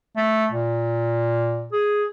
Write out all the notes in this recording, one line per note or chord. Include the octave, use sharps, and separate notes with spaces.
A3
A#2
G#4